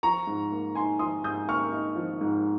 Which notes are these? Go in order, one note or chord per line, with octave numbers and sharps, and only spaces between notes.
F3 A#5 C#6
G#2
A#3
D#4 G#5 C6
F3 C6 D#6
G#2 D#6 G6
A#3 C#6 F6
D#4
F3
G#2